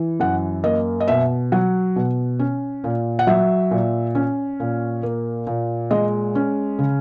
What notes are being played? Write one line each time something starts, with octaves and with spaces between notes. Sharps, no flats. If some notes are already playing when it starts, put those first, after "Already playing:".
Already playing: E3
F#2 F#5
A#3 D#5
D#5
B2 E5
F#3 F#5
B2
C#4
A#2
F#5
F#3 E5
A#2
C#4
A#2
A#3
A#2
G#3 D#5
C#4
C#3